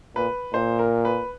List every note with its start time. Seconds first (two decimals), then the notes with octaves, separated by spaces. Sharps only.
0.16 A#2 B4
0.54 A#2 C5
0.79 A#4
1.05 B4